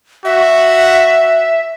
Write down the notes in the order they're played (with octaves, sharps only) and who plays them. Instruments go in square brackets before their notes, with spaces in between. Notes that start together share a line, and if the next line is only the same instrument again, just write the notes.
[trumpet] F#4 [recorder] E5